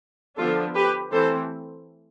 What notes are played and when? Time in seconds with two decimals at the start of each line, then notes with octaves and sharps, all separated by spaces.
0.37 D3 F3 B3 D4 F4 A4
0.75 G4 B4
1.12 E3 A3 C4 A4 C5